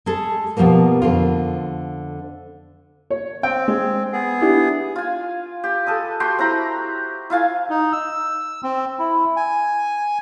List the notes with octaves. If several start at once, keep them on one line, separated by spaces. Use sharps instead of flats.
G#3 G#4 A4
B2 D3 F3 G3 A#3
F2 D3 F4
C#5
C4 G5
G#3
B3 G#4
D4 E4 G4
F4 G#5
G4
G#4 A4 B4 D#5
F#4 G4 G5 C6
C4 E4 A#5 B5
E4 F4 F5 G#5
D#4
E6
C4
E4
G#5